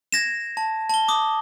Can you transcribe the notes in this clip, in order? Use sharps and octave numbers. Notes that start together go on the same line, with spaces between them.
G#6 A#6 E7
A5
A5 G7
D6 D#6